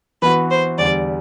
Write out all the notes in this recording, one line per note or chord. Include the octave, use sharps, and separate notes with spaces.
E3 B3 F#4 B4
C5
E2 D3 G3 D5